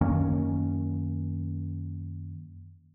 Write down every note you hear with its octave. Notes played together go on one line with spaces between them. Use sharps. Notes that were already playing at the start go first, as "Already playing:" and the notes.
F#2 D#3 A#3 C#4